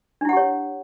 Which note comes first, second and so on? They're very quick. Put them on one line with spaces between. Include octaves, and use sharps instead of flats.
D4 E4 F#5 G4 C#5